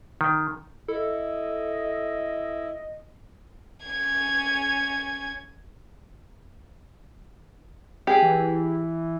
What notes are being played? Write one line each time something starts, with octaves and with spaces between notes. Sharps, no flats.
D#3
E4 A4 D#5
C#4 G#6
G4 G#4
E3